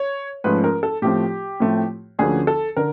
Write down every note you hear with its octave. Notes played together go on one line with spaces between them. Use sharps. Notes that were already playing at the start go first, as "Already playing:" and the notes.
Already playing: C#5
G#2 F3 A3 C#4 B4
A#4
A4
A2 F3 A3 C4 G4
A2 F3 A3 C4
D2 D3 F3 A#3 C#4 G#4
A4
D3 A#4